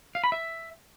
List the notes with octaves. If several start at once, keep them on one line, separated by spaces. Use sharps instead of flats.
F5
B5
E5